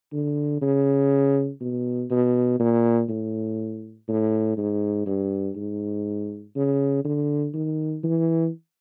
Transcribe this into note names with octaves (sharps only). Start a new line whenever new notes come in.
D3
C#3
B2
B2
A#2
A2
A2
G#2
G2
G#2
C#3
D3
D#3
E3